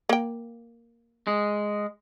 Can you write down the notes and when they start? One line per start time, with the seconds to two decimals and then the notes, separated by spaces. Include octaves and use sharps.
0.09 A#3 G5
1.27 G#3